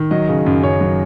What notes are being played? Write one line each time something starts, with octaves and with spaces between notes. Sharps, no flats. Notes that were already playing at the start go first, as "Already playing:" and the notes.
Already playing: D#3
F#3 D#5
C#3
F#2
F#2 C#5
F#3